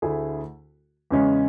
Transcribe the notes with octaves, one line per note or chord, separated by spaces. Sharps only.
D2 D3 A3 E4 G#4
E2 C#3 G#3 C#4